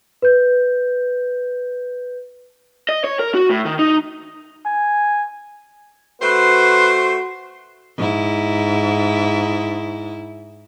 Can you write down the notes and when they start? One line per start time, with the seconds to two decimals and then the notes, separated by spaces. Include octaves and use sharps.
0.22 B4 G6
2.89 D#5
3.04 C#5
3.19 A#4
3.34 F#4
3.51 A2
3.65 D#3
3.79 D#4
4.66 G#5
6.22 A3 F#4 B4 C5 C6
7.97 G#2 E4